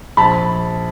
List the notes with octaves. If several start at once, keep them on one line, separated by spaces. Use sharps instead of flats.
A#1 A5 B5